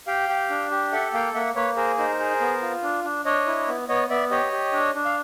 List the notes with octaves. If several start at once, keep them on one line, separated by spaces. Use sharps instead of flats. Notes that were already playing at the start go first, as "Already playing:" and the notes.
G4 F5 G5
G4
D4
G4
A4 E5 F#5
A#3 F5 G5
A#3 E5 F#5
A#3 B4 C#5
G#4 A#4 C5
D#4 A#4 C5
G#4
B3
F4
D4
D4
D4 C#5 D#5
E4
B3
B3 C#5 D#5
B3 D5 E5
G4 C#5 D#5
G4
D4
D4
F5